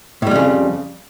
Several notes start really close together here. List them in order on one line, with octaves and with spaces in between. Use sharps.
A2 G3 F2 C#3